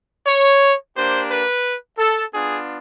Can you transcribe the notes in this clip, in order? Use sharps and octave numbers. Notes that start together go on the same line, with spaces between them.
C#5
A#3 D4 G4 C5
B4
A4
B3 D4 F4 G#4